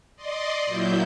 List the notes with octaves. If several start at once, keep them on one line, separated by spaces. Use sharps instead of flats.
D5 D#5 C6
A#2 F#3 E4 G6